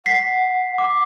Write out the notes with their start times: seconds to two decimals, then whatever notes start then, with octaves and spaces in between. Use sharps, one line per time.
0.06 F#5 B6 C7
0.78 D6